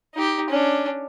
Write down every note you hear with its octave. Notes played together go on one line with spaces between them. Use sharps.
D#4 G4
C#4 D4